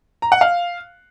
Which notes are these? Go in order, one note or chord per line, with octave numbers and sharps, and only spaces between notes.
A#5
F#5
F5